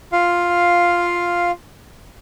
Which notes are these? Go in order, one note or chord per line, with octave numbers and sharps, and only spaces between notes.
F4 F5